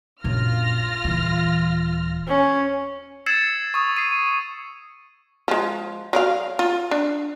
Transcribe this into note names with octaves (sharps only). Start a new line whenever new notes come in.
A#1 F#2 F4 F6 A#6
D#1 E3
C#4
E6 G#6 A6 C7 C#7 E7
C#6 D#6
C7 D#7
F3 G#3
F#3 D5 F5
F4
D4